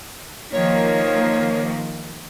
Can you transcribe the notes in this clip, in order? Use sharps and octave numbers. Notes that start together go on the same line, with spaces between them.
D#3 F3 A#3 C#5